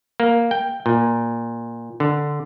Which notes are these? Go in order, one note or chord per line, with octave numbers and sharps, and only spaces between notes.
A#3
G5
A#2
D3